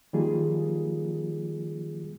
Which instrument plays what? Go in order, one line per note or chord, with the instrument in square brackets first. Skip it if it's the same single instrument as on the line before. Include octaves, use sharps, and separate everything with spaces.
[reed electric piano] D#3 F3 G3 A#3 F4 G#4